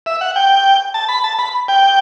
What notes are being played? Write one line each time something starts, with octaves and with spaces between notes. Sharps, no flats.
E5
F#5
G5
A5
B5
A5
B5
G5